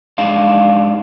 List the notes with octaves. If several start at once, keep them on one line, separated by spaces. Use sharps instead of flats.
G#2 D4 F5